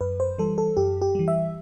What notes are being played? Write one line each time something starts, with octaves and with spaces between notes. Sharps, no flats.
F#2 B4
C5
E3 G3 A4
A4
F#2 G4
G4
E3 G3
E5